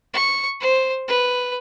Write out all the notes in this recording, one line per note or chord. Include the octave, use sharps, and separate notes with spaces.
C#6
C5
B4